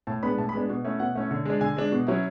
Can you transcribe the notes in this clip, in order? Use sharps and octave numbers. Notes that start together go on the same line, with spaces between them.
A2 A5
G#3 B3 D4 B5
A2 A5
B5
G#3 B3 D4
B2
A3 C#4 E4
B2 F#5
A3 C#4 E4
D3
G#3 D4
D3 G#5
G#3 D4
B2
F#3 C#4 E4